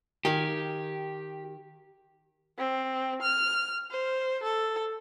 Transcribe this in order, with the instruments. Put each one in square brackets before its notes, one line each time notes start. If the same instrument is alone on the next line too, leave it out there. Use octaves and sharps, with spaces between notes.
[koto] D#3 F5 G#5 [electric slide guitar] G4
[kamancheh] C4
F6
C5
A4